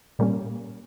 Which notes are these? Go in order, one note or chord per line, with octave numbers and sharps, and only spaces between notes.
A#2 G3 A#3 C#4